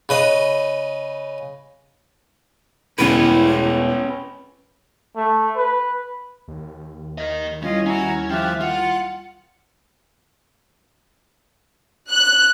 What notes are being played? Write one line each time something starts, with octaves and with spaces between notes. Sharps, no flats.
C#3 B4 D#5
E1 E2 C#4 E4 B4
A3
B4
D#2
A#4 D#5
G3 C#4 E4 F4 D#5
C#4 E4 F#4 G#5 A#5
F3 G4 E5 G5 F6 F#6
F4 F#5
F#6